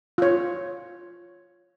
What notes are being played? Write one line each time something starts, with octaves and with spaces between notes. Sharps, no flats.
F4 C#5